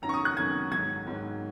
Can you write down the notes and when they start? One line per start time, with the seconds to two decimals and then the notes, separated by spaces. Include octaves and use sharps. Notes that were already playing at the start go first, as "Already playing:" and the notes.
0.02 F#2 D#3 F#3 A#5
0.09 C#6
0.14 D#6
0.25 F#6
0.37 F#2 D#3 F#3 G#6
0.72 G#2 D#3 F#3 G#6
1.07 G#2 D#3 F#3